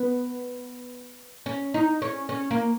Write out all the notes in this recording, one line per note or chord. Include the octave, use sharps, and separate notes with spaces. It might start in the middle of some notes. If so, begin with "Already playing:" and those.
Already playing: B3
C#4
D#4
C#4
C#4
A#3